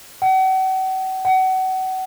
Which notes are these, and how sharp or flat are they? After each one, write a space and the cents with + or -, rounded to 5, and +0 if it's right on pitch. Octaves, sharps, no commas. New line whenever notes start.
F#5 +40
F#5 +30